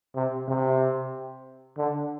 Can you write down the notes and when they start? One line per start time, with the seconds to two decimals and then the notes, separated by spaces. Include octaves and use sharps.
0.16 C3
0.48 C3
1.77 D3